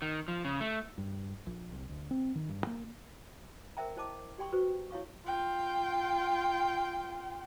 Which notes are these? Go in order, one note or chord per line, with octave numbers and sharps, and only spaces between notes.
D#3
F3
C#3
A3
G2
A#1
C2
D2
C4
D#3
G2
A#3
A#4 C5 E5 G5 A#5
E4 C5 D#5 A5 D6
G4 D5 G5 C6 C#6
F#4 B4 C5 C#6
E4 C#5 F5 C#6
F4 G5